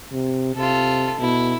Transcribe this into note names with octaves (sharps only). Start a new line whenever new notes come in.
C3
C3 F4 A4
B2 E4